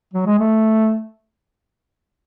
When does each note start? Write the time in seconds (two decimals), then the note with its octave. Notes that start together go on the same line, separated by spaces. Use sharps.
0.13 F#3
0.26 G#3
0.39 A3